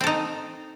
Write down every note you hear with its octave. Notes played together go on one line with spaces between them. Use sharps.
C4 D#4 A4